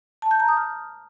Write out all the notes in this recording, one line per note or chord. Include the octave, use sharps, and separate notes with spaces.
A5
G6
A#5
D#6
F6